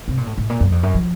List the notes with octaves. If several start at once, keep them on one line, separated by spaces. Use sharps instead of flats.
C3
A#2
A2
A2
A#2
F#2
F2
F#2
F3